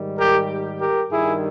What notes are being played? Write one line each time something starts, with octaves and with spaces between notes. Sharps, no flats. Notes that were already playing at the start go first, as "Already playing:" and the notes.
Already playing: G#2 D#3 G3
G4 A#4
G4 A#4
G2 D#3 G3 E4 G#4